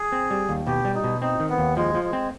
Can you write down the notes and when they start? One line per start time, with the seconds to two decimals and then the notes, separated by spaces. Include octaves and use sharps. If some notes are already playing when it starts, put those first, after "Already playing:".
Already playing: G#4
0.12 C4
0.30 G3
0.49 D#2
0.67 B2 G4
0.85 G3
0.95 D#4
1.04 B2
1.22 C4 D#4
1.40 D#3
1.50 B3
1.58 D#2
1.77 F3 G#3
1.95 F3
2.03 G#3
2.13 C4